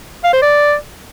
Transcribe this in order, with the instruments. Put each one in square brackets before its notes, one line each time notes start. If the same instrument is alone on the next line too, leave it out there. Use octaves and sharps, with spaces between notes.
[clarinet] F5
C5
D5